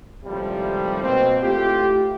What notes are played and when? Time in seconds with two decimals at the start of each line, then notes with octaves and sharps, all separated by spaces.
0.25 G#1 A2 C3 F3 G3
1.02 B2 A#3 C4
1.43 A3 E4 F4 G4